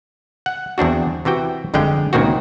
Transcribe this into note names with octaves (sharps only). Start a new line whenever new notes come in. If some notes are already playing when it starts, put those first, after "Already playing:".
F#5
E2 C4 D4 F#4
C3 E3 F#4 G5
G1 F2 D3 G#3 G5
C#2 A#2 D#3 C4 F#4